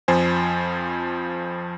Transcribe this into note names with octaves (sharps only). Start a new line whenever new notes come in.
F2 F3 C5 G#5